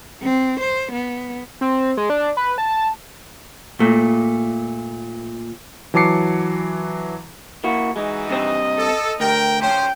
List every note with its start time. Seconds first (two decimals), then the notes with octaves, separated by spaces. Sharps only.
0.23 C4
0.61 C5
0.93 B3
1.61 C4
1.97 G#3
2.10 D4
2.37 B4
2.58 A5
3.80 A#2 A3
5.94 E3 F#3 A5 D6 C7 C#7
7.64 A#3 E4 F#4
7.96 E3 G#3 D#4 F#4
8.30 G2 C3 C4 D#5
8.78 A4
9.20 D2 A#4 G5
9.61 F3 C#4 C5 G5